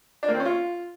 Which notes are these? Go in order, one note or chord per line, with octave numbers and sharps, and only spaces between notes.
D4
A#3
C4
C#4
F4